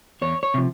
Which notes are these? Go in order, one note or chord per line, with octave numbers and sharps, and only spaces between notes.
E2 C#5
C#5
C3 F3